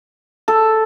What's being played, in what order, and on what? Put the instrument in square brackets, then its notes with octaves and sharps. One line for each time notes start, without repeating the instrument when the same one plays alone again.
[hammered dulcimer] A4